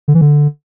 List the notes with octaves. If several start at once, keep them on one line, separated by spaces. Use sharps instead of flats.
D3
E3
D3